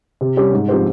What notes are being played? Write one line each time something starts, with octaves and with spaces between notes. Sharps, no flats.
C3
G3 C#4 G4
G#2
F3 C4 G4 C5